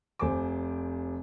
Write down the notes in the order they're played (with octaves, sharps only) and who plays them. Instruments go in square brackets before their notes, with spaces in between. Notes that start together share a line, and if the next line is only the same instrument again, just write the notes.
[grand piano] F1 C5 G#5 D6